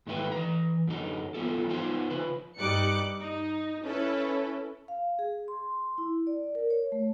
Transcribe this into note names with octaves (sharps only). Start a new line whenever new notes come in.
G#2 D#3 A3 E4 G4 B4
E3 A#5
F#2 D3 D#4
F3 G3 B3 F4 A4
B3 D#4 F4 C5 D5 G#5
C#3 F3 B4
G2 G3 D#4 D6 F#6 C#7
D#4
C#4 E4 A4 B4
F5
G#4
C6
E4
D5
A#4
C#5
A3